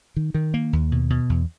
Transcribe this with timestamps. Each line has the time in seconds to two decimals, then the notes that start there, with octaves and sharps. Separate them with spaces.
0.16 D#3
0.34 D#3
0.54 A#3
0.73 D#2
0.92 B2
1.10 B2
1.29 E2